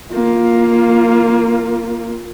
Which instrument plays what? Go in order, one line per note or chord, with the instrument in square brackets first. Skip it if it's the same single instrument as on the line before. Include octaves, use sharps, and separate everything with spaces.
[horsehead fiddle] A#3 F4